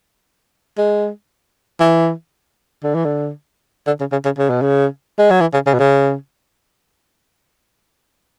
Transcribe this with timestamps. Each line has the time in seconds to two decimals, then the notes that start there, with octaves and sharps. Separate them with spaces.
0.78 G#3
1.80 E3
2.84 D3
2.95 E3
3.05 D3
3.87 D3
4.00 C#3
4.12 C#3
4.25 C#3
4.39 C#3
4.50 B2
4.62 C#3
5.19 G#3
5.30 F#3
5.41 E3
5.54 C#3
5.66 C#3
5.74 B2
5.79 C#3